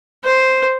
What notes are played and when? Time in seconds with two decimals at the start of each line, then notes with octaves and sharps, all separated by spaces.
0.24 C5